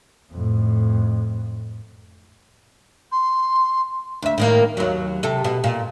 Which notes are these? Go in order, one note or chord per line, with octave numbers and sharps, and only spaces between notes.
F2 A2
C6
D2 E5
A2 D#3 A#3
D#2 F#3
C3 A4
B2
A#2